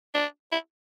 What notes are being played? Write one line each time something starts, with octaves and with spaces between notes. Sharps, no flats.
D4
E4